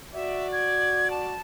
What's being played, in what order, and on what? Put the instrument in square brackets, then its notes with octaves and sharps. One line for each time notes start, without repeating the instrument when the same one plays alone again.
[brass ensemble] F#4 D5 [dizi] E5
[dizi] G#6
A5